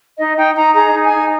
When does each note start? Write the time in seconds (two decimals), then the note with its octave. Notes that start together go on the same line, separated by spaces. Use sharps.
0.18 D#4 D#5
0.37 D#4 G5
0.56 D#4 A#5
0.75 G#4 A#5
0.94 D#4
1.04 G#5
1.14 D#4